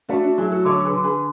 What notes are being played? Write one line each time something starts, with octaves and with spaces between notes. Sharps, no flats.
A3 D4 F#4
D4 F#4
F#3 E4 G#4
F#4 A4
D3 A4 C#5
G#4 B4
D3
G#4 B4